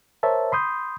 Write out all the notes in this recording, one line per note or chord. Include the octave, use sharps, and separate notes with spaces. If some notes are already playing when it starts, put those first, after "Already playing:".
A#4 C5 C#5 E5 A5
B5 C6 D#6 G6